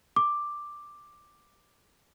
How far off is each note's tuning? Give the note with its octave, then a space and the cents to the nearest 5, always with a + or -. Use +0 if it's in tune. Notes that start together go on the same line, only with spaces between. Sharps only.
D6 +5